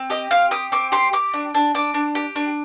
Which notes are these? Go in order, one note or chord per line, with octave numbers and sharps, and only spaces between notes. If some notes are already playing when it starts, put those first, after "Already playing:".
Already playing: C4
G4 D#5
C4 F5
G4 D#6
C4 D6
G4 C6
G4 D6
D4
D4
D4 D6
D4
G4
D4